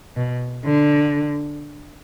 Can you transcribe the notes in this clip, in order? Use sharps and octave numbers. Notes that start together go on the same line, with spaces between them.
B2
D3